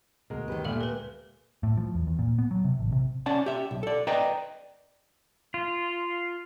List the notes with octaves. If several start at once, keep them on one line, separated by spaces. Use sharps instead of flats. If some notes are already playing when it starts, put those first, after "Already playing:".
D2 B2 G#3 F#4 A#4
D#3 G4 B4
A#2 G#3 A3 G4 A4 F5 G#5
A#4 B4
A2
F3
E2
E2
A#2
B3
F#3
C3
A1
C3
C#4 D5 F#5 A5
G4 E5
B1
A4 D5
B4 D5 D#5 G5 A#5
F4